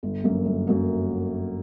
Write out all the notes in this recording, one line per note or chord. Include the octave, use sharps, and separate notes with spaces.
G1
F#2 F#3 A#3
G1
F#2 F#3 A#3